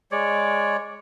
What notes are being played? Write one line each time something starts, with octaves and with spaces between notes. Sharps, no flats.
G#3 C#5 D5